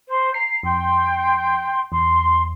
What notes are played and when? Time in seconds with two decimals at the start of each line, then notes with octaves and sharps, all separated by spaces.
0.07 C5
0.34 A#5 C7
0.63 F2 G5 C6
1.92 E2 C6